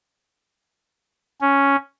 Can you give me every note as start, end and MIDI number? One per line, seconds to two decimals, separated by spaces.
1.41 1.76 61